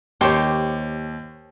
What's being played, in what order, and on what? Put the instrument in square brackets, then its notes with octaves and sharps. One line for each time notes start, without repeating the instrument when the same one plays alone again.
[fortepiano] D#2 [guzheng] G4 C5 C#5